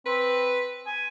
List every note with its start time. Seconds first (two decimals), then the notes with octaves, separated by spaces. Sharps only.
0.06 C4 B4
0.86 G#5